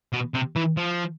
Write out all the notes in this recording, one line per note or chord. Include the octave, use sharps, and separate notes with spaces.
B2
C3
E3
F3